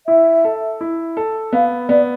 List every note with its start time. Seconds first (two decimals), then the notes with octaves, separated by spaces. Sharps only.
0.07 E4 E5
0.44 A4
0.81 E4
1.17 A4
1.53 B3 F5
1.89 B3 D5